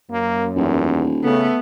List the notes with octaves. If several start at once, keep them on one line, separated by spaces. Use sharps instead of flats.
F#2 A#3
D#1 E2
C#3 A3 B3 A4